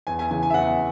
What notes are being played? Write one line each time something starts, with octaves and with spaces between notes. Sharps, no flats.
E2 G#5
G#5
C#3 E3 G#5
G#5
E5
E2 F#5